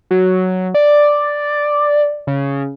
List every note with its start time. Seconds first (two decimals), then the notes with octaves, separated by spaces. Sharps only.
0.11 F#3
0.74 D5
2.27 C#3